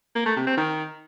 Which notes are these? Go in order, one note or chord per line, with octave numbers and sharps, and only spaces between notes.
A#3
A3
C3
C4
D#3